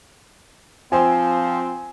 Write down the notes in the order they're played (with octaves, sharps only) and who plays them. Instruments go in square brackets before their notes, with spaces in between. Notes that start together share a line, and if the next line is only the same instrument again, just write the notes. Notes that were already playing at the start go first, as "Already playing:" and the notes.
[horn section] F3 C4 [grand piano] G#5